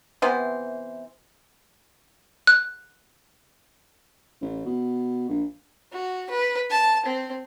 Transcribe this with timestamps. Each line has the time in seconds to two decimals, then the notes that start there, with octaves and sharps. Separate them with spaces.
0.22 C3 E3 B3 C5
2.47 F#6
4.42 A1
4.65 B2
5.29 A#1
5.93 F#4
6.30 B4
6.70 A5
7.06 C4